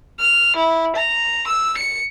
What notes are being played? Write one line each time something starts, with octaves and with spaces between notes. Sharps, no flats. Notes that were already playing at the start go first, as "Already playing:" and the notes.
F6
E4
A#5
E6
C#7